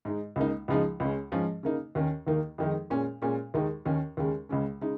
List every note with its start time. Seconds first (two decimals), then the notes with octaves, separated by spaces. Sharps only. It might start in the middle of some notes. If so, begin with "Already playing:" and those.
0.05 G#2 G#3 D#4
0.36 C#2 C#3 A#3 D#4
0.68 C#2 C#3 F3 G#3 D#4
1.00 C#2 C#3 G#3 C#4
1.32 G#2 F3 C#4
1.63 C#3 A#3 D#4
1.95 D#2 D#3 C#4
2.27 D#2 D#3 A#3 D#4
2.58 F2 D#3 G#3 D#4
2.90 A#2 G#3 C#4
3.22 A#2 G#3 C#4
3.54 D#2 D#3 G#3 D#4
3.85 D#2 D#3 C#4
4.17 D#2 C#3 G#3 C#4
4.49 C#2 C#3 G#3 C#4
4.81 C#3 G#3 D#4